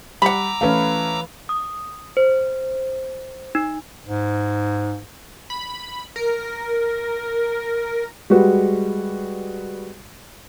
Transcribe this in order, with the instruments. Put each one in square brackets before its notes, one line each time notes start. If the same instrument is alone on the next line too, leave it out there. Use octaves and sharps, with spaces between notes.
[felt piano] G3 [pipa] F#5 B5 [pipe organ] A#5 D6 E6
[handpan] E3 B4 F5 [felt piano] A3 C#4
[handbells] D#6
C5
D#4
[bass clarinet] G#2
[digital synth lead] B5
A#4
[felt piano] G3 G#3 F#4 B4